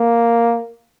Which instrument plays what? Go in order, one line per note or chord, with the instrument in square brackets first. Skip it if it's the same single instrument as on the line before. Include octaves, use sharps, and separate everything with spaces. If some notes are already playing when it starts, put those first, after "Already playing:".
Already playing: [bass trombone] A#3